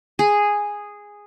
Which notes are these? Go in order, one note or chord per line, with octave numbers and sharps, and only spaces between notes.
G#4